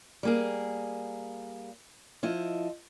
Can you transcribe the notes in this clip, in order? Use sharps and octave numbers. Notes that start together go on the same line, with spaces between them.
G3 A#3 G#4
F3 E4 D#5